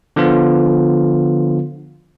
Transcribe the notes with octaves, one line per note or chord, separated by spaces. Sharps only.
D3 F3 B3 F4